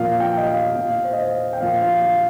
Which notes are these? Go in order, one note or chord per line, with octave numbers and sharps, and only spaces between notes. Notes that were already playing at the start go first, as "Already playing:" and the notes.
Already playing: A#2 F3 A#3 F5
G5
D#5
F5
A#2 A#3 F5
C5
D#5
C5
G5
A#2 F3 A#3 F5
F5
F5